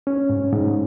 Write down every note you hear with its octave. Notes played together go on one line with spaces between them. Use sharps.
C#4
G#2
G#2